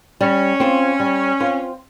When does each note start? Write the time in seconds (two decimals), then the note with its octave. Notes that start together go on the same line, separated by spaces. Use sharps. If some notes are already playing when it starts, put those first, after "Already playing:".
0.21 G3 C#4
0.60 C4 F4 C5
1.00 G3
1.40 C4 F4 C5